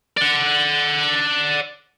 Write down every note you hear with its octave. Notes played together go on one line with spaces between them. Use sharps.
D5 F#5